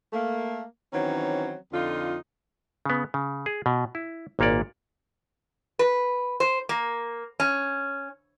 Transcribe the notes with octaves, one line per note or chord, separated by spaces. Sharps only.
A3 A#3
D#3 E3 F#3 C4 C#4
F2 D3 D#4 F4
C#3 B3
C#3
G#4
B2
E4
G#1 A#2 A#3 C#5 D5
B4
C5
A#3
C#4